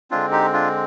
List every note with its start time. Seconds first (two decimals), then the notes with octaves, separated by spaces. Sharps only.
0.11 D3 G#3 C4 D4 F4
0.31 D#4 G4
0.53 D4 F4